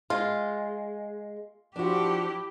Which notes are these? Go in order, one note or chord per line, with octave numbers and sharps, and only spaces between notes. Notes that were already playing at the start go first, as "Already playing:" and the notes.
G#3 F4
F3 D4 E4 F#4 G4